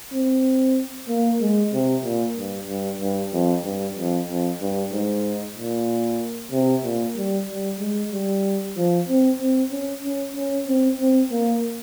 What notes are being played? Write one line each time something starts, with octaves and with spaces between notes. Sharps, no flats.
C4
A#3
G#3
C3
A#2
G2
G2
G2
F2
G2
F2
F2
G2
G#2
A#2
C3
A#2
G3
G3
G#3
G3
F3
C4
C4
C#4
C#4
C#4
C4
C4
A#3